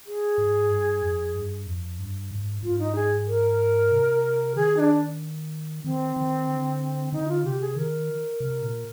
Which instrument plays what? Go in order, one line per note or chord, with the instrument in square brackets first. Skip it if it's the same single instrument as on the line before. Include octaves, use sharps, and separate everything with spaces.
[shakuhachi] G#4
[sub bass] G#2
G2
F2
G2
F2
G2
G#2
[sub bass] G#2 [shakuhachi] F4
[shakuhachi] D#4
G#4
A#4
[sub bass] C3
[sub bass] D#3 [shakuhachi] G#4
[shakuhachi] D#4
D4
[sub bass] D#3 [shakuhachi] C4
[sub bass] D#3
D3
[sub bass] D3 [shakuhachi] D#4
[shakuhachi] F4
[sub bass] C3 [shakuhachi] G4
[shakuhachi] G#4
[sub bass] D#3 [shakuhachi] A#4
[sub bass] C3
A#2